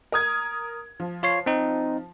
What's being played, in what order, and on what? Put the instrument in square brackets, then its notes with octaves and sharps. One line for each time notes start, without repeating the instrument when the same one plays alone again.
[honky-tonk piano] A#4 D#6 G#6
F3
[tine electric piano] F4 C#5 C7
C4 D#4